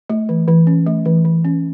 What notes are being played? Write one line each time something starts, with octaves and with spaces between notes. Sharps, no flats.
A3
E3
E3
C#4
A3
E3
E3
C#4